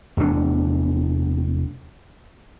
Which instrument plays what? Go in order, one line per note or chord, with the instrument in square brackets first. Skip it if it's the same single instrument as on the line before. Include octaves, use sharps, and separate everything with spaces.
[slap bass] F1 E2 A3 D4